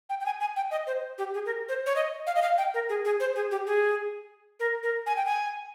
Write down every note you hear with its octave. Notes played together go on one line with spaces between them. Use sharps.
G5
G5
G#5
G#5
G5
D#5
C5
G4
G#4
A#4
C5
C#5
D#5
F5
D#5
F5
G5
A#4
G#4
G#4
C5
G#4
G4
G#4
A#4
A#4
G#5
G5
G#5